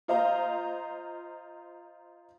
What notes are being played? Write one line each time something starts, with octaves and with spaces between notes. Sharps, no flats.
F4 C5 D#5 F5 A#5